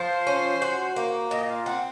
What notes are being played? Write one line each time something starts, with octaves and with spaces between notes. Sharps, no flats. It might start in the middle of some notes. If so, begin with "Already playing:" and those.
Already playing: F3 C5
C#4
F#4
A#3
A#2 D#5
F5
C4 F#5